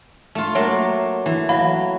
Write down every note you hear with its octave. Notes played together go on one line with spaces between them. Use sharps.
A3 F4
F#3 A3 A#3 C#5
E3
F#3 F5 B5